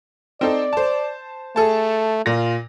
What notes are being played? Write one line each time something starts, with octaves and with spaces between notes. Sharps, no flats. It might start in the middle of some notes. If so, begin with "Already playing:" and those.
C4 D#4 A4 D5
C5 A5
A3 G#4 A4 A5
A#2 F4 A#6